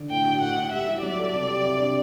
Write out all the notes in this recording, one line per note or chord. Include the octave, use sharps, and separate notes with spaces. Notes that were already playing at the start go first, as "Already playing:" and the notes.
Already playing: D3
A2 G5
F#4
A2 F#5
E4
G3 E5
G3
F#3 D5
A4
C3
G4
C3
D4